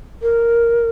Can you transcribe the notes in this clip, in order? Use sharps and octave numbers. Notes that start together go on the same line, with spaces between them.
A#4